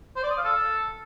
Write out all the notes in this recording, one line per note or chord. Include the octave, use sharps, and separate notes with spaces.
C5
D5
D#6
F5
A4